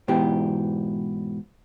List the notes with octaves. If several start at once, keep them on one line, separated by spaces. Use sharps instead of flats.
G#2 B2 E3 G4